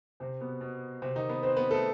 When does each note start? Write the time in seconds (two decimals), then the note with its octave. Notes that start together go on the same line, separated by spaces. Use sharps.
0.20 C3 C4
0.41 B2 B3
0.61 B2 B3
1.02 C3 C4
1.16 D#3 D#4
1.29 B3 B4
1.43 C4 C5
1.57 B3 B4
1.70 A3 A4